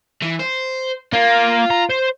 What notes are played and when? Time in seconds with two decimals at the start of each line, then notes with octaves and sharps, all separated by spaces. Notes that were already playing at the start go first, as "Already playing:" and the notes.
0.22 E3
0.39 C5
1.13 A#3 F4
1.70 A#5
1.89 C5